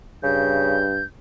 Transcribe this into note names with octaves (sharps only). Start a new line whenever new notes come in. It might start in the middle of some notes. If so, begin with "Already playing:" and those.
G2 C#3 G6